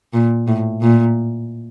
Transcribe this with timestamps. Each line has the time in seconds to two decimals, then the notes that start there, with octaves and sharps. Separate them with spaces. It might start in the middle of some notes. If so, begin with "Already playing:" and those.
0.13 A#2
0.48 A2
0.82 A#2